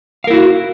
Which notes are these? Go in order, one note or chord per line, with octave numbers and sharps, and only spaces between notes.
E4 F#4 A#4 F5